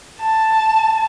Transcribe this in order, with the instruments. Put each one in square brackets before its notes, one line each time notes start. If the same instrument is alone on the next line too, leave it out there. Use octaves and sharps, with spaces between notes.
[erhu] A5